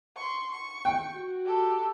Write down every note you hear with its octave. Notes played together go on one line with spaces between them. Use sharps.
C6 C#6
C#6
G5
F#4
G4 A4